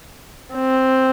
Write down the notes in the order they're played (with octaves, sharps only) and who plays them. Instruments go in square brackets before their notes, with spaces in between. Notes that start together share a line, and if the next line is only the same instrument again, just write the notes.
[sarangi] C4